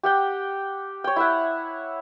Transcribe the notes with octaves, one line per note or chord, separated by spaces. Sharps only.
G4 F#5 G5
C#5 G5
E4 E5 F#5